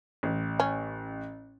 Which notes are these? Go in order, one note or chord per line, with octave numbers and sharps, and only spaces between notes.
A1
C#4